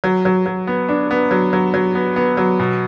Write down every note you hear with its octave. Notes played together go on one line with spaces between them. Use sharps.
F#3
F#3
F#3
B3
D4
B3
F#3
F#3
F#3
B3
B3
F#3
B2